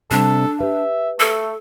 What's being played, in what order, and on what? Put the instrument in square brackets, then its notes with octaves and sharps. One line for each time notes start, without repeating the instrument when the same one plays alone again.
[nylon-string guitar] C3 G3 C4 [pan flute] D4 [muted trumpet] A4
[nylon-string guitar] G4 B4 [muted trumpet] E5
[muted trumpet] A3 [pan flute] A4